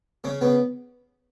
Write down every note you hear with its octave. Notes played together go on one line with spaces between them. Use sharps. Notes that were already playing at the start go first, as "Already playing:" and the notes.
C#3 C#4
C#3 B3